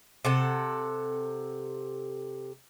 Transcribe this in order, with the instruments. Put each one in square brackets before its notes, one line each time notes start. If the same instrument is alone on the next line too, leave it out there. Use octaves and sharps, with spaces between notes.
[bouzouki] C3 A4 F#5